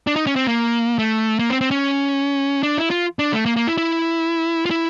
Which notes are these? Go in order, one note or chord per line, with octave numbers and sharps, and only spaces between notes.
D4
D#4
C#4
C4
A#3
A3
A#3
C4
C4
C#4
D4
E4
F4
D4
A3
A#3
A#3
E4
E4
F4
E4